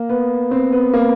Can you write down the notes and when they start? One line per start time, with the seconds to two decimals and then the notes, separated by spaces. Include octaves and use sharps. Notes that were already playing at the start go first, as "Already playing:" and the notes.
Already playing: A#3
0.09 B3
0.51 C4
0.72 B3
0.94 A#3